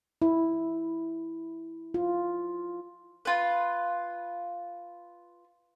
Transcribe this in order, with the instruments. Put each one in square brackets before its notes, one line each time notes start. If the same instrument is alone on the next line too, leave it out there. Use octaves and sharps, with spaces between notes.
[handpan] E4
F4
[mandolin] F4 B4